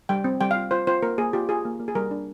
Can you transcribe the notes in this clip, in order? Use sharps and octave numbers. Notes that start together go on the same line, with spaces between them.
G3 G5
C4
G3 G5
F5
F4
F4 C5
F4 C5
A#3 A#4
A#3 G#4
F4 G4
F4 G#4
A#3
A#3
G#4
G3 A#4
D4